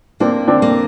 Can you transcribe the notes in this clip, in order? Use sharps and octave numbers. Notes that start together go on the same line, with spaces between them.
A#3 C4 D4
C4 D4
A#3